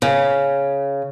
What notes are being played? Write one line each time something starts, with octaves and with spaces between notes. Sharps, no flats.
C#3